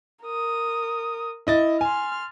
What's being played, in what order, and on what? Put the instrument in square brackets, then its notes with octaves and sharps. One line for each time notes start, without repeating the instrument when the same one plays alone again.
[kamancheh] A#4 D#6
[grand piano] E4 D#5 A6
[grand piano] G#5 [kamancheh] C6 F6